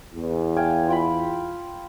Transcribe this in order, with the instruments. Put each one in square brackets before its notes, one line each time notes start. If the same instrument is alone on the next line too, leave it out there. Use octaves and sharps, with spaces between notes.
[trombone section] E2
[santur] F5 G5 G#5
F4 G5 B5